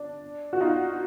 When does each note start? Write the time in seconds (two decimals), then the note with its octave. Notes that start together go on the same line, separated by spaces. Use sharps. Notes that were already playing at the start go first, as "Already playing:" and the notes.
Already playing: D4
0.53 F#4
0.61 D#4 F4